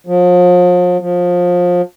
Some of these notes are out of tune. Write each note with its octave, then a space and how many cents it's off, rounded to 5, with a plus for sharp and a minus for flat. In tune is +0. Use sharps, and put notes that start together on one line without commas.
F3 +40
F3 +25